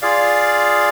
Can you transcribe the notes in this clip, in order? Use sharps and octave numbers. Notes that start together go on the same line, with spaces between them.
F4 G#4 D5 F5